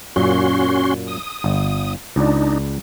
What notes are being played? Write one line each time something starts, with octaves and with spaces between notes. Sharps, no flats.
F#2 A#2 C#4 F#4 C6
D#6
G1
C#2 D4 D#4 D5